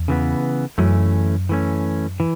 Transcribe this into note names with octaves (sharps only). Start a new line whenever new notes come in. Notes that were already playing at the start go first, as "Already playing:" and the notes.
Already playing: E2
C#3 E3 B3
F#2 E3 A3 C#4
E3 A3 C#4
E3